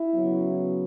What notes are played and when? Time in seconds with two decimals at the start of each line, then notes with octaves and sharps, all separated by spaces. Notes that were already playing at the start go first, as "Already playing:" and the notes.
Already playing: E4
0.14 C#3 F#3 B3